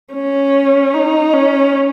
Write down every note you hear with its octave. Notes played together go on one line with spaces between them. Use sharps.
C#4
D#4
C#4